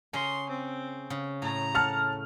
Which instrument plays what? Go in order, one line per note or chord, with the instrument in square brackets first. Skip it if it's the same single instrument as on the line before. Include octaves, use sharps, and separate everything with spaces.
[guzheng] C#3 C#4 A#5 [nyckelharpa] C6
[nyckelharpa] C4
[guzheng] C#3
[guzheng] A2 [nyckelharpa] A#5
[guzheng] F#5 [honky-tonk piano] A5 F6